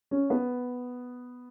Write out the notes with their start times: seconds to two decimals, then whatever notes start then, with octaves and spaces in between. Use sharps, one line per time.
0.11 C#4
0.30 B3